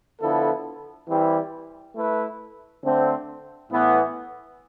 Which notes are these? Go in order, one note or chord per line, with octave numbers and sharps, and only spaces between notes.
D3 F3 B3 E4 A4
E3 G3 C4 E4 G4
A3 E4 B4
D3 A3 C4
A2 E3 B3